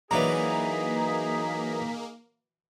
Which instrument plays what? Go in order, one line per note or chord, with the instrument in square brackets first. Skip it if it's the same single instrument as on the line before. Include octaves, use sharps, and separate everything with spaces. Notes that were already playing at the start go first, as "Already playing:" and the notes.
[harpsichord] E3 F#3 D4 [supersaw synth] A#3 [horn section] D#4 G#4 [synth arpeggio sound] A#5 B6